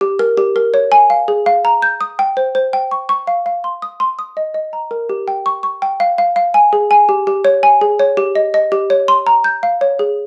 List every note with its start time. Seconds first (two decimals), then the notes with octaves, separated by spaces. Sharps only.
0.01 G4
0.19 A#4
0.37 G4
0.56 A#4
0.74 C#5
0.92 G#5
1.10 F5
1.28 G#4
1.46 F5
1.65 A#5
1.82 G6
2.01 D#6
2.19 G5
2.37 C5
2.55 C5
2.73 G5
2.91 C#6
3.09 C#6
3.27 F5
3.46 F5
3.64 C6
3.82 D#6
4.00 C6
4.19 D#6
4.37 D#5
4.54 D#5
4.73 A#5
4.91 A#4
5.09 G4
5.28 G5
5.46 C#6
5.63 C#6
5.82 G5
6.00 F5
6.18 F5
6.36 F5
6.54 G#5
6.73 G#4
6.91 G#5
7.09 G4
7.27 G4
7.45 C#5
7.63 G#5
7.81 G#4
7.99 C#5
8.17 G4
8.35 D#5
8.54 D#5
8.72 G4
8.90 C#5
9.08 C6
9.27 A#5
9.44 G6
9.63 F5
9.81 C#5
9.99 G#4